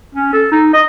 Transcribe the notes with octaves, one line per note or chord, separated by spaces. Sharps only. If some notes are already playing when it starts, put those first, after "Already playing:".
C#4
A4
D#4
D#5